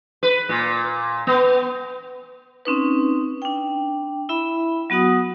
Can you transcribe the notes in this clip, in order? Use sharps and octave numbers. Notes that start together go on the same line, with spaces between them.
B4
A#2
B3
C4 C#4 D#4 B4
D4 G5
E4 E5 B5
F#3 B3 F#4 F#5 D#6